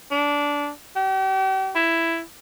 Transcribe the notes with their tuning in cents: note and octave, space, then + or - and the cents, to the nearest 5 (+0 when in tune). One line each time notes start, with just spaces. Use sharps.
D4 -20
G4 -40
E4 +10